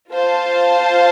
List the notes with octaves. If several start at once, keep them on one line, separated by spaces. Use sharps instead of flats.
F4 C5 F5 A5